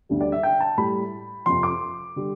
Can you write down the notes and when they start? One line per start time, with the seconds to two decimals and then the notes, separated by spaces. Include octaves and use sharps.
0.09 D2 D3 G3
0.21 D5
0.32 E5
0.43 G5
0.60 A5
0.78 A2 G3 B5
1.46 F2 C3 F3 C6
1.63 D6
2.16 D3 G3